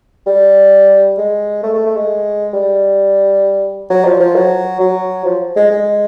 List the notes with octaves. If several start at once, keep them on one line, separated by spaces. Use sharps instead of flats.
G3
G#3
A3
A3
A3
G#3
G3
F#3
F3
F3
F#3
F#3
F3
G#3
G#3